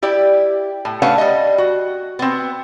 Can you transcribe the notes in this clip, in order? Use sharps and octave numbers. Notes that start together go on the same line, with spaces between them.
E4 G4 D5
A2
A3 C#4 D4 B4 F5 F#5
G3 D#5
F#4
B3 C4